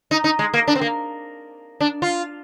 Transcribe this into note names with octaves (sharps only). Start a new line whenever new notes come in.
D#4
D#4
G#3
A#3
D4
C4
A#3
D4
F4